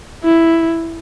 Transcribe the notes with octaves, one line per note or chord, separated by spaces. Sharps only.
E4